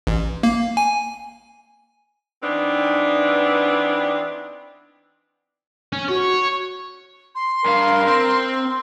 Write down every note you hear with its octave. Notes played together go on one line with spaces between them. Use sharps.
A1
A#3
G#5
E3 B3 C4 D4 D#4
C#4
F#4 C#5
C6
G2 A#4 F5
C4